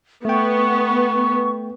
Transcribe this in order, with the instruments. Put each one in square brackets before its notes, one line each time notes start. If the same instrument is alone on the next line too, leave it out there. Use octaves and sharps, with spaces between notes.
[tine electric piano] A3 G5 [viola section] B3 [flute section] C#6